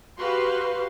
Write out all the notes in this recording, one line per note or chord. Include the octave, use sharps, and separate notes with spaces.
F#4 G4 B4 F5 C6